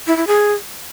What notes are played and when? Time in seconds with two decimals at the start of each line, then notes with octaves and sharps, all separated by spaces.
0.07 E4
0.17 E4
0.27 G#4